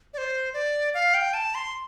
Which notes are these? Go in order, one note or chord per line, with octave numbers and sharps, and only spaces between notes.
D5
C5
D5
F5
G5
A5
C6